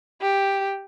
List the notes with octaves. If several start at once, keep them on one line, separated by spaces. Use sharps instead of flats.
G4